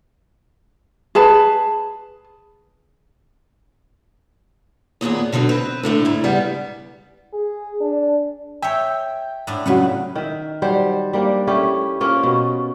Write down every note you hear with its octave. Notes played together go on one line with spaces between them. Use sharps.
G#4 B4 A5
D#2 A#2 B3 G#4
B2 D3 F#3 D#4
C4 B4
A2 D3 A3
G#2 E4
C#3 G3 B3
G#4
D4
C#5 E5 G5
A2 D4
F#2 A2 C#3 F#3 B4 F#5
D#3 E5
F#3 G3 C5
G3 A#3 D4
A3 C#4 E4 G4
A#3 C#4 F4 C5
B2